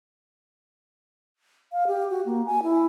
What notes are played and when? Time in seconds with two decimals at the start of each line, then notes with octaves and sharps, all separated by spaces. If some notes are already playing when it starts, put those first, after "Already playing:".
1.72 F5
1.87 G4
2.10 F#4
2.26 A#3
2.46 G#5
2.63 E4